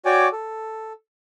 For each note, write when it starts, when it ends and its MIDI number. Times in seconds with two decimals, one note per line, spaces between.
0.05 0.28 66
0.05 0.28 73
0.05 0.28 74
0.05 0.28 79
0.05 0.28 80
0.05 0.28 86
0.32 0.93 69